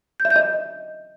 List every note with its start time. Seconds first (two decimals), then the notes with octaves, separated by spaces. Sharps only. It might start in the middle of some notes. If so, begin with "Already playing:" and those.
0.20 G6
0.25 E5
0.30 G6
0.36 D#5